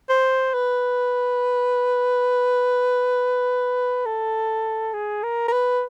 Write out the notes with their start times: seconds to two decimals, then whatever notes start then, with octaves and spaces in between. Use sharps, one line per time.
0.09 C5
0.54 B4
4.06 A4
4.94 G#4
5.23 A#4
5.48 A#4
5.53 B4